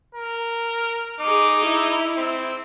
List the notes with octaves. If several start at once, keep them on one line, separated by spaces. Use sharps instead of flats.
A#4
D#4 G#4 D6
E4
C4